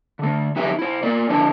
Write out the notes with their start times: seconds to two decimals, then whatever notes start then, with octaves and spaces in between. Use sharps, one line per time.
0.19 D3 A3
0.56 F3 F#3 D#4 G4 B4 E5
0.79 E4 C5
1.03 A#3 A#4 D5
1.29 D3 F3 D4 E4 B4 A5